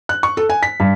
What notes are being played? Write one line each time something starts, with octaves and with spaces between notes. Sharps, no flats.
F#6
C#6
A4
G#5
B6
G2